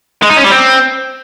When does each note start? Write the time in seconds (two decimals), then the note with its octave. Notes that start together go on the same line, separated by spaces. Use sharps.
0.23 G#3
0.30 D#4
0.37 C#4
0.44 G3
0.51 C4